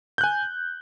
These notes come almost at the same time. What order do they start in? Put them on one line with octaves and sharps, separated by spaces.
G6 F#6 G#5